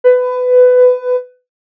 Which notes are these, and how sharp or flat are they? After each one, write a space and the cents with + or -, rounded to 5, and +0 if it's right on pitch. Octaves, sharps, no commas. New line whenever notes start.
B4 +20